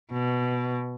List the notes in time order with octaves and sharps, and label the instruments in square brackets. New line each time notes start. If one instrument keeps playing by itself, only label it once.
[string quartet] B2